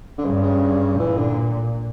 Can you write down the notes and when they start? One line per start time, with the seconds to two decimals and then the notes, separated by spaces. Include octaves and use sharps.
0.18 D3
0.25 G2 C#3
0.43 C#3
0.99 A#2 E3
1.17 D3